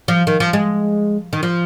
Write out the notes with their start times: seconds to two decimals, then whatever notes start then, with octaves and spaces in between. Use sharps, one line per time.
0.08 F3
0.27 D#3
0.40 F3
0.53 G#3
1.33 D#3
1.43 F3